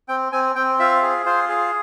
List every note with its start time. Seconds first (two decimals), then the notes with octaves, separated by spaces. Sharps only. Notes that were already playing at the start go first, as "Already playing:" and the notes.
0.08 C4 G5
0.32 C4 G#5
0.56 C4 G5
0.80 F4 E5
1.02 G#4
1.26 F4 C5
1.49 G#4